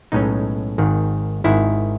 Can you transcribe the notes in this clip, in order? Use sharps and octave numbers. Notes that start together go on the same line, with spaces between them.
B1 A2 G#3 C#4 D#4
G#1 G#2 D#3
G#1 G#2 D#3 E4